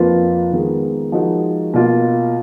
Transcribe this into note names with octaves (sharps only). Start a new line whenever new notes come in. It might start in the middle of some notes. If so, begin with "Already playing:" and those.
Already playing: F2 F3 A#3 F4 B4
D#3 G#3 B3
F3 G#3 D#4 F#4 A#4
B2 A#3 F4